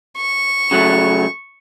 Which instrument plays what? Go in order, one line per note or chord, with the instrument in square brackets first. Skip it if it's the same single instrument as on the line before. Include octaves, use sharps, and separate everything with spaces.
[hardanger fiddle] C#6
[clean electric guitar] C#3 F#3 A3